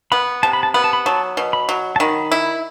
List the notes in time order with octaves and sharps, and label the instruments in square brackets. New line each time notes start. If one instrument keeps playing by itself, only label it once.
[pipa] B3 [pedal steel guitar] B5
[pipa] C3 [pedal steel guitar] A5
[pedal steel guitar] B5
A5
[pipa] B3 [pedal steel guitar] B5
[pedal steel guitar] A5
B5
[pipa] F#3 [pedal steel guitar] A5
[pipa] B2
[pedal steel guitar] B5
[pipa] F#3
[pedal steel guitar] A5
[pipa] D#3 [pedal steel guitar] B5
[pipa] E4